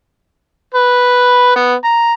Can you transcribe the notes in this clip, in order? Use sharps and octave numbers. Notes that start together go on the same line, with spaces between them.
B4
B3
A#5